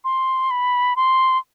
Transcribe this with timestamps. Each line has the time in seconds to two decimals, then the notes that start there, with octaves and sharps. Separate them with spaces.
0.04 C6
0.51 B5
0.96 C6